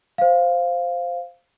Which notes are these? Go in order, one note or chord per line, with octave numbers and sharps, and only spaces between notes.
C5 F5